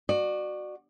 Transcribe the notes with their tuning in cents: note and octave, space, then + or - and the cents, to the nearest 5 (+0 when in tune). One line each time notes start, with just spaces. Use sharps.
F#4 +0 D5 +30